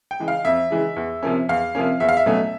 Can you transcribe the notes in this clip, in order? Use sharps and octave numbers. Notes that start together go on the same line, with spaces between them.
G5
C#3 E3 G#3
F5
F2 E5
C#3 E3 G#3
E2
C3 F3 A#3 C#4
E2 F5
C3 F3 A#3 C#4
E2 E5
F5
E5
B2 F#3 A3 C#4